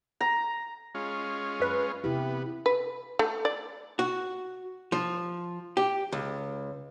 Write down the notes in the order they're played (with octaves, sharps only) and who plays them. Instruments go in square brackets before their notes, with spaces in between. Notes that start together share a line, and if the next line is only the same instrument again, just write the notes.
[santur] A#5
[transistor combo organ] G#3 C#4 F4
[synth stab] F#2 B4
[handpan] C3 E4 G4 [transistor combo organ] B3
[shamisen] B4
A3
D5
[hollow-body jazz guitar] F#4
F3
G4
C#2